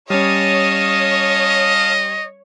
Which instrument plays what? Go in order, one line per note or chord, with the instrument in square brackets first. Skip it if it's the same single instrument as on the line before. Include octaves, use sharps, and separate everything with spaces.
[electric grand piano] G3 C#4 [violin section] C#5 [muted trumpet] D#5 [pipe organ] F5 A5 D#6